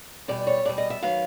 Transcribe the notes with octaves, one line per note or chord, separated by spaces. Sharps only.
E2 B2 G3 D5
C#5
E2 B2 G3 D5
D#5
E5
D#3 F#3 B3 F5